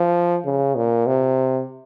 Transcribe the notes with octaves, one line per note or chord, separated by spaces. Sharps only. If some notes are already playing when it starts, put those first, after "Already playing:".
Already playing: F3
C#3
A#2
C3